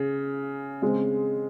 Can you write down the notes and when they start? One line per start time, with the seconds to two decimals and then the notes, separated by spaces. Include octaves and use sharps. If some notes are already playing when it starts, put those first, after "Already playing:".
Already playing: C#3
0.82 C#3 G#3 C4